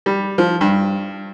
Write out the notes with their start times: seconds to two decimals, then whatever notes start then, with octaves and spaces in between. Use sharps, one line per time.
0.06 G3
0.38 F3
0.61 G2